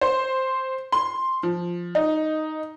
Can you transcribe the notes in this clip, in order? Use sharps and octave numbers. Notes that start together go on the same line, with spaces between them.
C5
C6
F3
D#4